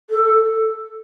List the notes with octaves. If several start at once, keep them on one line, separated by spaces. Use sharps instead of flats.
A4